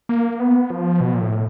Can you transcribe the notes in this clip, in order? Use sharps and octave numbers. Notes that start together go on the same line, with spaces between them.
A#3
B3
F3
B2
A#2
A2